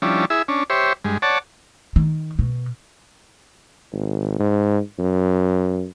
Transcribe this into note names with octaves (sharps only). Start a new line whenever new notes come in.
F3 G3 C#4 D4 E4
E4 G#4 E5
C#4 D4
G4 C5 C#5 E5
G2 G#3
C#5 D5 F#5 A5
D#3
B2
G#1
G#2
F#2